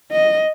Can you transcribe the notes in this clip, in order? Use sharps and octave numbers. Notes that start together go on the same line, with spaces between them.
D#5